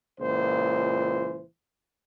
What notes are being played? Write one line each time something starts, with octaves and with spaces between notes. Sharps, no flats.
C#2 A#2 E3 C5